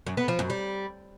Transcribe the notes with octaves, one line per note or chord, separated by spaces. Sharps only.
F#2
B3
F3
F#2
G3